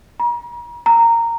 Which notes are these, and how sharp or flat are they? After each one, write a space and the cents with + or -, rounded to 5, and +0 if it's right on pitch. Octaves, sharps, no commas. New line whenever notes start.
A#5 +40
A#5 -15